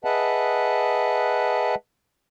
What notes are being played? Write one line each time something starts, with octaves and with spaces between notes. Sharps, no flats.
G#4 B4 D#5 E5 F#5 A5